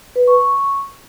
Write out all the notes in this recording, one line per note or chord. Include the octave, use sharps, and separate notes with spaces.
B4
C#6
C#6